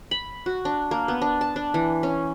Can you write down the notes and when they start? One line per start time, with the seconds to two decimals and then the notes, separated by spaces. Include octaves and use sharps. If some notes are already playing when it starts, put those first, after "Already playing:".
0.11 B5
0.46 F#4
0.65 D4
0.91 A#3
1.08 B3
1.22 D4
1.41 A5
1.56 D4
1.74 E3
2.03 C#4